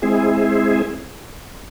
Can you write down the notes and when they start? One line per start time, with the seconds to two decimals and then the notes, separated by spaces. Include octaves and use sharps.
0.02 G#3 C4 E4 G#4